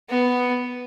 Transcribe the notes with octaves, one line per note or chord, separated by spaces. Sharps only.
B3